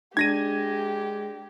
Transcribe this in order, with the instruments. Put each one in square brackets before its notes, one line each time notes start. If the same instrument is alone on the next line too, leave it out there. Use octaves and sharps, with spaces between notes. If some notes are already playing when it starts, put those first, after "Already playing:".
[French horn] G#3 [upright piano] D4 [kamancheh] G4 [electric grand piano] G#6 A#6 D#7